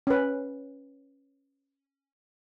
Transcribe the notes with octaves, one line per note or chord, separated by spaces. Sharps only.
C#4 B4